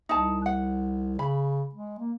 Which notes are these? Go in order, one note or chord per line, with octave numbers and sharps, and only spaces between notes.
C2 D#4 A5
F#5
C#3 B5
G#3
A#3